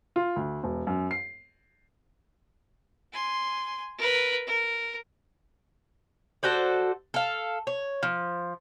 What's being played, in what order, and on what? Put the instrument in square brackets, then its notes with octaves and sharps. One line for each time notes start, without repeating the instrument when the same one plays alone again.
[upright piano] F4
D2
E1
F#2
C7
[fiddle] G#5 C6
A#4 B4
A#4
[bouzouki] F#4 A4 C5 D5
A4 F5
C#5
F3